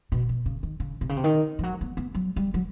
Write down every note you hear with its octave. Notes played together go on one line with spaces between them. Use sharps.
B2
B2
C#3
D#3
C#3
C3
C#3
C3
D#3
F3
F#3
B3
B3
F#3
G3
F#3